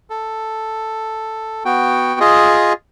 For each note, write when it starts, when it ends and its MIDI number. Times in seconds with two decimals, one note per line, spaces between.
0.10 1.63 69
1.65 2.19 59
1.65 2.19 66
1.65 2.19 79
2.20 2.73 65
2.20 2.73 68
2.20 2.73 75